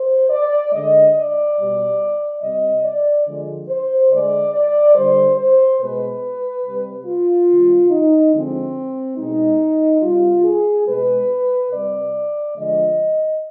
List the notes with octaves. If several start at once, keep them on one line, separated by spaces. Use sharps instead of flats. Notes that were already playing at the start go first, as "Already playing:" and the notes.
Already playing: C5
D5
D3 G#3 D#5
D5
B2 G3
C3 G3 D#5
D5
D3 F3 G#3
C5
D3 G#3 D5
D5
D3 G3 C5
C5
B2 G#3 B4
C3 G3
F4
C3 D#3 G3
D#4
D3 F3 G#3 C4
B2 G#3 D#4
C3 G3 F4
G#4
B2 G#3 B4
C3 G3 D5
D3 F3 G#3 D#5